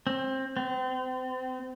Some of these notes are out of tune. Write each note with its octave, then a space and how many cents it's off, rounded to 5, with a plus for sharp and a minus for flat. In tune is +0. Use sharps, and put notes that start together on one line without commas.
C4 +20
C4 -35